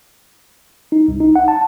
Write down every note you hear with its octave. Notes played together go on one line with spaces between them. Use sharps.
D#4
C2
D#4
F#5
A5